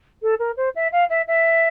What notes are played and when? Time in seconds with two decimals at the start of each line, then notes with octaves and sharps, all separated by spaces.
0.22 A4
0.39 A#4
0.56 C5
0.75 E5
0.92 F5
1.09 E5
1.27 E5